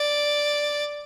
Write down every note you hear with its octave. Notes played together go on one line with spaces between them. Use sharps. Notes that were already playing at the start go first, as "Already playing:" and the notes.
Already playing: D5